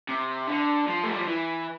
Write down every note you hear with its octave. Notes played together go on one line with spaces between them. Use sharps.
C3
D3
F3
A3
G3
F3
E3